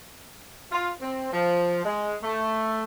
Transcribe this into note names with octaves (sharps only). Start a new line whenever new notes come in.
F4
C4
F3
G#3
A3